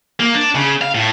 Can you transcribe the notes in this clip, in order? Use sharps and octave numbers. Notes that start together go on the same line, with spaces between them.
A#3
D4
C#3
F5
A2